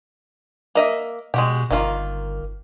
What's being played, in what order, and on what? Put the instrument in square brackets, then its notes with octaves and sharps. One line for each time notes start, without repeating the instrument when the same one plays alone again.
[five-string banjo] A#3 D#5 E5
[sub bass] B2 [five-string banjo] G#3 F#4 G4
[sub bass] G1 [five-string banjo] D#3 A#3 F4